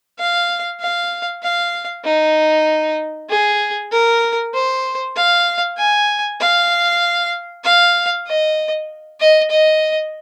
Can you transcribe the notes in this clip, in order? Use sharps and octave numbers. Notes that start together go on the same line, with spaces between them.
F5
F5
F5
D#4
G#4
A#4
C5
F5
G#5
F5
F5
D#5
D#5
D#5